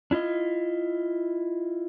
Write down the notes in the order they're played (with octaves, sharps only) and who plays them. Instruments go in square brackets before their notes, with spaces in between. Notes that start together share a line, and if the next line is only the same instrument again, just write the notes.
[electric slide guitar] D4 E4 F4 D#5